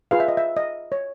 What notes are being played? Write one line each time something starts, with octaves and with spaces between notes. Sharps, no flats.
F4 G#4 B4 F5
E5
D#5
E5
D#5
C#5